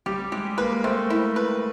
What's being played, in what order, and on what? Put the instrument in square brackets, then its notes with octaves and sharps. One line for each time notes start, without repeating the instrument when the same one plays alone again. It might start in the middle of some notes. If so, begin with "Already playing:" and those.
[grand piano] G3 [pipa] G4
[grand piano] G#3 [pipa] G4
[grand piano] A#3 [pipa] B4
[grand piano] A3 [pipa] C4
[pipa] E4
B4